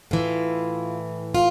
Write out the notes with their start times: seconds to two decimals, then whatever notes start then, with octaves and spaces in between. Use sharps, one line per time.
0.11 A2 E3 F4
1.35 F4